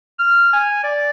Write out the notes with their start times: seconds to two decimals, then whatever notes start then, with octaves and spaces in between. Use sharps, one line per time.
0.19 F6
0.53 G#5
0.84 D5